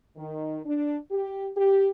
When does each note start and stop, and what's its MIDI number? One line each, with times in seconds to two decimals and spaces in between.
0.16 0.58 51
0.65 0.97 62
1.11 1.49 67
1.56 1.87 67